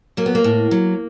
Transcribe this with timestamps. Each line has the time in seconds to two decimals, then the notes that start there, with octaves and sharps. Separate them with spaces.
0.17 F#3 A#3
0.26 B3
0.35 A#3
0.44 A2
0.71 F#3